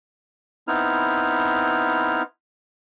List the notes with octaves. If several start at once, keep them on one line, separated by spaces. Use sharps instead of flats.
B3 C4 D#4 E4 F6